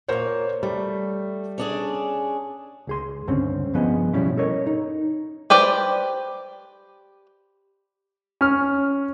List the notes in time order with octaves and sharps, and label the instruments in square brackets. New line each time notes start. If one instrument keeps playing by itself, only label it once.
[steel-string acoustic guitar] A#2 A#3 [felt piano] A#4 C5 C#5
[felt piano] G3 [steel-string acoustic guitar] A3
[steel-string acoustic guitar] C#4 D4 G#4
[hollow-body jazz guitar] C#2 G#4 C6
C#2 G2 D3 C4 C#4
G2 F3 B3 G#4 D#5
B2 F3 G3 C#4 E4
A4 A#4 C#5 D#5
D#4
[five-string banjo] G4 B4 C5 D5
[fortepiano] C#4 F6